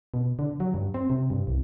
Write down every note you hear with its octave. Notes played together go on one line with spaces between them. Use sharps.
B2
D3
F#3
G2
C4
C3
G2
C2